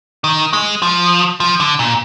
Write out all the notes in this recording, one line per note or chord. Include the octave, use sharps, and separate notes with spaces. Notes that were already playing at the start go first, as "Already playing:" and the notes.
D#3
G#3
F3
F3
D3
A#2